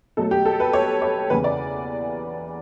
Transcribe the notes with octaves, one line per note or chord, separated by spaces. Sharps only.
B2 F#3 A3 A4
G4
A4
B4
C#5
C#5
E2 C#3 E3 B4
D5